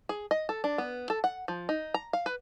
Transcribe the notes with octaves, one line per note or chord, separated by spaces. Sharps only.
G#4
D#5
A4
D4
B3
A4
F#5
F3
D#4
A#5
F5
B4